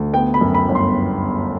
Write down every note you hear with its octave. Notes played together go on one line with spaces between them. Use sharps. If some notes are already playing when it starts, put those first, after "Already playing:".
Already playing: D2
B3 G5
B5
F#2
B5
G1
C6